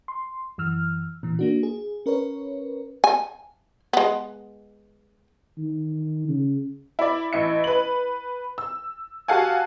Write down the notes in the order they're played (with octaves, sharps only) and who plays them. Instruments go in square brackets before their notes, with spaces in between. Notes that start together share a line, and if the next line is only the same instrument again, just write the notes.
[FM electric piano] C6
F#2 E3 E6 F6
A#2 E3
A#3 D4 F#4
G#4
C#4 A#4 B4 C#5
[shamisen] G#5
G#3 B3
[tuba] D#3
C#3
[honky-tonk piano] E4 D5
A1 E4 C#7
B4 F#7
E6
F#4 G4 A4 F5 F#5 G#5